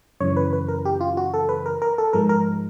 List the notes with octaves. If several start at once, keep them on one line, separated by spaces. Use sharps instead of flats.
F#2 C#3 E3 C#5
B4
B4
A#4
G4
F4
F#4
A4
B4
A#4
A#4
A4
G#2 F3 G#3 A#4
A#4